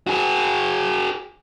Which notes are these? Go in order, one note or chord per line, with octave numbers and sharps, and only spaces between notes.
F#4 G#4